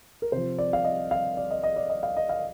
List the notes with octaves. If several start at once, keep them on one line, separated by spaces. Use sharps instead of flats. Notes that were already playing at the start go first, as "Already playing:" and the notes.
A#4
C3 F3 C5
D5
F5
D#5
F5
D5
D#5
D#5
D5
D#5
F5
D#5
F5